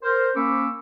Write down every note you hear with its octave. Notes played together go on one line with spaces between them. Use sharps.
A#4 C5
A#3 C#4 B5 C#6 D6 E6